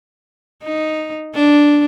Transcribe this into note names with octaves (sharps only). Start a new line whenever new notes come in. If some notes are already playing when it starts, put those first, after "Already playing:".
D#4
D4